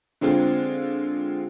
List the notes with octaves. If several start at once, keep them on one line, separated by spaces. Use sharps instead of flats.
D3 G#3 C4 F4